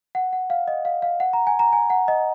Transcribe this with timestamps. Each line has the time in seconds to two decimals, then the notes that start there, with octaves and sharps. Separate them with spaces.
0.15 F#5
0.33 F#5
0.50 F5
0.68 D#5
0.85 F5
1.02 F5
1.20 F#5
1.33 A#5
1.47 G#5
1.59 A#5
1.73 G#5
1.90 F#5
2.08 D#5